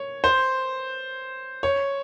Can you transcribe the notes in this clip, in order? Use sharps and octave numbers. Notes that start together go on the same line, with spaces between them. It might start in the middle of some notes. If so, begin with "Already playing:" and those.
Already playing: C#5
C5
C#5